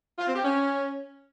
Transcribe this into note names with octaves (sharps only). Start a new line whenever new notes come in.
F4
C4
G4
C#4